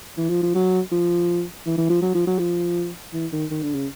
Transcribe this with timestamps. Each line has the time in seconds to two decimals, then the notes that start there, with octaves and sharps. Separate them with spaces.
0.17 E3
0.29 F3
0.43 F3
0.55 F#3
0.92 F3
1.66 E3
1.77 E3
1.90 F3
2.02 F#3
2.15 F3
2.27 F#3
2.39 F3
3.13 E3
3.32 D#3
3.51 D#3
3.63 D3
3.75 C#3